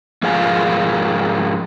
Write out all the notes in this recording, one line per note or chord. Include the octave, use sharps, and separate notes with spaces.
G#2 F3 G#4 A#4 F5 G#5